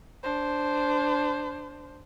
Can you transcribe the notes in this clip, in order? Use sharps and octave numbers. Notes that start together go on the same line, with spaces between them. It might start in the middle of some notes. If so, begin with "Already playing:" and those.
D4 C5